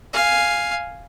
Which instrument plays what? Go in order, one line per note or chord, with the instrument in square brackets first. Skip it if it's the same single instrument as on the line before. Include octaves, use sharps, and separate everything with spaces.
[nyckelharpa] F5 G#5